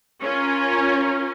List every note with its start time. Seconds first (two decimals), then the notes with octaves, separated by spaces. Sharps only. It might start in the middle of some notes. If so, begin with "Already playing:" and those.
0.22 C#4 F4 A#4